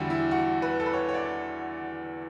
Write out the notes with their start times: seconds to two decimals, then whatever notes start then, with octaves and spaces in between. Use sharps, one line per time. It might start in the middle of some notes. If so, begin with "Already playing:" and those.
Already playing: E2 D3 G3 E4 F#4
0.10 E4
0.31 F#4
0.62 B4
0.80 A4
0.86 B4
0.93 C#5
1.09 C#5
1.14 D5